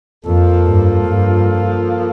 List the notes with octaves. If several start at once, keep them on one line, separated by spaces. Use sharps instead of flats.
F2 F3 A#3 F4 A4
G2
G2